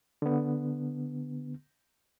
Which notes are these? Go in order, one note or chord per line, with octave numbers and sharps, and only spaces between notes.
D3 B3